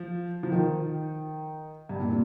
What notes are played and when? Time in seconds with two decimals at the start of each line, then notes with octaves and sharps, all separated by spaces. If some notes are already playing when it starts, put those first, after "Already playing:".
Already playing: F3
0.43 F3
0.52 D#3
1.89 G2
2.00 A#2
2.09 C3